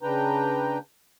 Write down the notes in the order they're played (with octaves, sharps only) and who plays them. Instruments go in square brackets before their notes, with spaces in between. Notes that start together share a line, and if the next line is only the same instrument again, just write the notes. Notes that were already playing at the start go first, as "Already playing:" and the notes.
[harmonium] C#3 D4 B4 G5 A#5